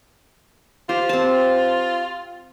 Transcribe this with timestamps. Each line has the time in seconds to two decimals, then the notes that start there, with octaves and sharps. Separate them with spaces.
0.89 F4 G4 C5
1.09 C4 A5